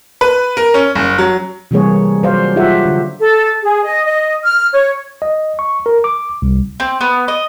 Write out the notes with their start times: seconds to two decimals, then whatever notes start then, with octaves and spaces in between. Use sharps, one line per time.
0.21 B4
0.57 A#4
0.74 C#4
0.95 F#1
1.18 F#3
1.71 C3 E3 G3 A#3 G#4 C#5
2.23 F#3 C5 D5 F5
2.56 F4 G4 G#4 E5 F#5
2.85 D3
3.19 A4
3.61 G#4
3.83 D#5
4.06 D#5
4.43 F6
4.72 C#5
5.22 D#5
5.59 C#6
5.86 A#4
6.04 D6
6.42 C2
6.80 C4
7.01 B3
7.28 D#5